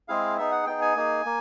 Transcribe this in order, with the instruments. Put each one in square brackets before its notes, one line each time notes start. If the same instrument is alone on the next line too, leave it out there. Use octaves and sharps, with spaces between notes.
[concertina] G#3 C4 E4 G#4 F5
B3 D#4 G#4 E5
F#5
B3 D#4 G#4 G5
G#5
A#3 D#4 G#4
A#3